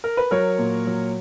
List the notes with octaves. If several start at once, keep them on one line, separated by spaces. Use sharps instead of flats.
A#4
B4
F#3 A#4 C#5
A#2
F#3